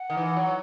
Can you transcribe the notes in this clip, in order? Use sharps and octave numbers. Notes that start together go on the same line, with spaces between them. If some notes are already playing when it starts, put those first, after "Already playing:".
Already playing: F#5
D#3
E3
F#3